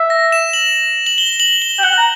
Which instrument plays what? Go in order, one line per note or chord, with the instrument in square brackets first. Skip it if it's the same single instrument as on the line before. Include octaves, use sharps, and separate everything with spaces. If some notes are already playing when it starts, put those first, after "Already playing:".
Already playing: [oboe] E5
[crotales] A#6
E7
F#7
F#7
G7
F#7
G7
[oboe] G5
[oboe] F#5 [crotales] G7
[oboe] A#5